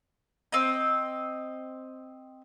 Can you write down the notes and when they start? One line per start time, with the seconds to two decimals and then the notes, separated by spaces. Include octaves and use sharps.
0.52 C4 D#5